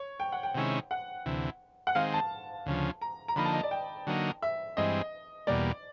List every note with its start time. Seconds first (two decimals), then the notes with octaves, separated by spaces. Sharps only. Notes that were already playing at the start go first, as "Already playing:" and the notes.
Already playing: C#5
0.20 G5
0.32 F#5
0.43 G5
0.55 C3 D#3 G#3 C#4 E4
0.91 F#5
1.26 D2 C3 E3
1.87 F#5
1.95 D#3 G#3 C4 F5
2.14 A5
2.66 D2 C#3 F3
3.01 A#5
3.28 A#5
3.36 D3 F3 A#3 D#4 B5
3.45 A5
3.54 D#5
3.63 D5
3.71 G5
4.07 D3 F#3 A#3 D#4
4.42 E5
4.77 G2 E3 G#3 C4 D#5
5.47 E2 B2 G3 A#3 D5